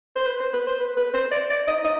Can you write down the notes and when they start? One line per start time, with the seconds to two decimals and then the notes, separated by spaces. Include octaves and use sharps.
0.16 C5
0.27 B4
0.40 C5
0.53 B4
0.67 C5
0.80 B4
0.97 B4
1.14 C5
1.32 D5
1.50 D5
1.68 D#5
1.85 D#5